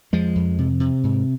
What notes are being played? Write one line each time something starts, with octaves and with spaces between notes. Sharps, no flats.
F2 F3 G#3
F2
C3
C3
G#2